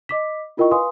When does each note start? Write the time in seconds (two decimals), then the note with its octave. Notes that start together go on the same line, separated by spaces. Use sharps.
0.09 D#5 D6 B6
0.57 E4 F4 A#4 D#5 G5 C#6
0.71 B4 F5 G#5 C6 D#6